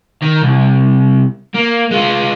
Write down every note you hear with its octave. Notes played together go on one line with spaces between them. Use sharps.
D#3
C2
A#3
G#3 F4